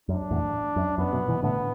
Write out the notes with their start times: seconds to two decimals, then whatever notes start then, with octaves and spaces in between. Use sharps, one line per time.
0.09 F#2 D4
0.31 E2 A2
0.76 F#2
0.98 F#2 B3
1.12 F#2 B2
1.28 B2 E3
1.43 A2 D3 B3